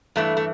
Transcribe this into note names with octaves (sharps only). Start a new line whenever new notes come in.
G2 E3 A3
A3